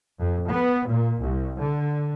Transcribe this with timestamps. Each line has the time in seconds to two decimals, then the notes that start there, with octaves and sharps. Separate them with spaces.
0.19 F2
0.49 B3
0.88 A#2
1.19 C2
1.59 D3